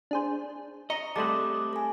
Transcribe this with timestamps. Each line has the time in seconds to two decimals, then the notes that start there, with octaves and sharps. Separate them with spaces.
0.11 D4 G#4 C5
0.90 D#5 A#5 C#6
1.16 G3 A3 C4 A5 D6 D#6 F#6
1.73 A4 G#5